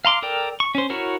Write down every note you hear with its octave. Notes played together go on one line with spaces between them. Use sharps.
F5 A#5 C6 D6
A4 A#4 D5 G5
C#6
C#4 C5
E4 F#4 A#4 C#5